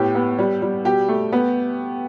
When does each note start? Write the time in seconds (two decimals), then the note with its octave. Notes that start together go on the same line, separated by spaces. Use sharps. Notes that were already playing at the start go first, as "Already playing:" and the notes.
Already playing: A2 B3 G4
0.15 B3
0.39 G3
0.62 G3
0.85 B2 G4
1.08 A3
1.32 B3